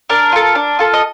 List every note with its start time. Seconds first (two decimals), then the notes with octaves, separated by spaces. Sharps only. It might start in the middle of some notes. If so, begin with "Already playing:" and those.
0.10 D4 A#4
0.32 F4 A4
0.55 D4
0.79 F4 A4
0.94 D#5